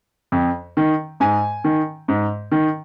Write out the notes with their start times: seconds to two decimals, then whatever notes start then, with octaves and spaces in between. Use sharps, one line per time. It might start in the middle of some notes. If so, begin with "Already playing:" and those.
0.32 F2
0.77 D#3
1.20 G#2 G#5
1.64 D#3
2.08 G#2
2.52 D#3